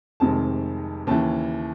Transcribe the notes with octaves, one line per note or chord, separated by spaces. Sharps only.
F1 F2 C3 D#3 G#3 A5
D#2 C#3 E3 A5